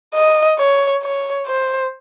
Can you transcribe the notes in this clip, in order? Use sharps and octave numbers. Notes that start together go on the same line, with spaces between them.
D#5
C#5
C#5
C5